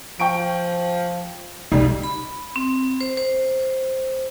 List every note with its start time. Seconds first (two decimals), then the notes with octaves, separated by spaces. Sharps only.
0.20 F3 G5 C#6 D7
1.72 B1 F2 G3 D#4
2.03 B5
2.56 C4
3.01 C5
3.17 C5